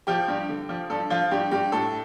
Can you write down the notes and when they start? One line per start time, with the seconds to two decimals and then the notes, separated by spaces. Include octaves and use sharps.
0.07 F3 G4
0.28 G2
0.49 D3
0.69 F3
0.90 G2 A4
1.10 F3 F4
1.31 G2 G4
1.51 G2 G4
1.72 A2 A4